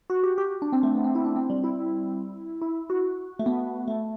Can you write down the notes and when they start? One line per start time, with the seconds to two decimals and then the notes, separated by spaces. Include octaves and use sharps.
0.10 F#4
0.23 G4
0.38 G4
0.62 D4
0.73 C4
0.83 A3
0.94 B3
1.04 C4
1.15 E4
1.25 D4
1.36 C4
1.50 G3
1.64 E4
2.62 E4
2.90 F#4
3.39 A3
3.46 B3
3.88 A3